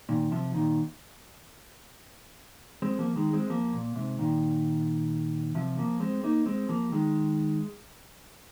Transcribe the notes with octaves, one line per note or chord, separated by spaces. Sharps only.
A#2 D#3
C3 F3
A#2 D#3
G#3 C4
F3 A#3
D#3 G#3
G#3 C4
F3 A#3
A#2
G#2 C3
A#2 D#3
C3 F3
F3 A#3
G#3 C4
A#3 D#4
G#3 C4
F3 A#3
D#3 G#3